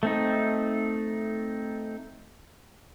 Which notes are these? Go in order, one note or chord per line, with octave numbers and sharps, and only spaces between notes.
A3 C4 D#4